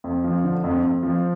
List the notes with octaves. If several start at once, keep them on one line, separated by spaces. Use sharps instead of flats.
F2
F3
D3
F2
F2
F3